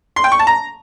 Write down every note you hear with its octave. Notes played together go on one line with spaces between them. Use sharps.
C6
G5
C#6
A5
A#5